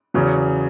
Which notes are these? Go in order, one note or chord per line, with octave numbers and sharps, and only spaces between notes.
E2 C#3 F#3 C#4